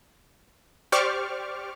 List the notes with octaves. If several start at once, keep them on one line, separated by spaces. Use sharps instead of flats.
G4 C5 D5 C#6 D6 F6